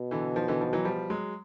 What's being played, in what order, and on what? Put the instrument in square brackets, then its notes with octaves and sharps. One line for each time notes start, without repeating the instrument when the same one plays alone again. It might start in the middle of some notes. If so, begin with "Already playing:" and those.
Already playing: [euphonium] B2
[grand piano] D3 E3
D#3 F3
D3 E3
D#3 F3
E3 F#3
F3 G3
F#3 G#3